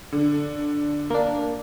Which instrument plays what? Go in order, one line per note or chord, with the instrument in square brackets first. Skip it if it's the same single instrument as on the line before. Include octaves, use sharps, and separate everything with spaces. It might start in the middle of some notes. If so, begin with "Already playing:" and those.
[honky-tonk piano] D3
[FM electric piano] A#3 D4